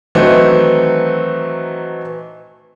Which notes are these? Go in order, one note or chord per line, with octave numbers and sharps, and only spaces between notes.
D#3 E3 F#3 A3 C4 D#4